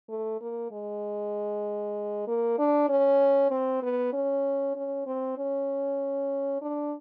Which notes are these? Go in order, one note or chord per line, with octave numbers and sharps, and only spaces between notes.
A3
A#3
G#3
A#3
D4
C#4
C4
B3
C#4
C#4
C4
C#4
D4